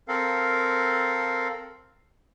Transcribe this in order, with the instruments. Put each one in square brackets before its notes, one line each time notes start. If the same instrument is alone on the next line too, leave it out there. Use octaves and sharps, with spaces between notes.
[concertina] C4 A4 A#4 F5